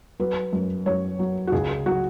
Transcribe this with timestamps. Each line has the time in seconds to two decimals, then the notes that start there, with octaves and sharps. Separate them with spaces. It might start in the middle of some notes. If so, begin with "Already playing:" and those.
0.19 F#3 B4
0.53 F#2
0.86 F#2 C#5
1.19 F#3
1.47 F#4
1.52 C#2 G#4
1.86 F#3 F#4